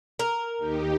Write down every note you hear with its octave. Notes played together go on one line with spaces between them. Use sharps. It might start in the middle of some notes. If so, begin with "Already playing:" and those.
A#4
D#2 D#4 G4